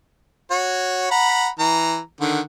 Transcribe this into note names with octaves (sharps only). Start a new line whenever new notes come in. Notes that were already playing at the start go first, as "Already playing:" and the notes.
F#4 C#5
F#5 A#5 B5
E3 A#5
D3 D#3 F#5